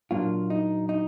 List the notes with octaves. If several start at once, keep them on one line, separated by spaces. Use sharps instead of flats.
A#2 F#3 A#3 D4 F4
D#4
D#4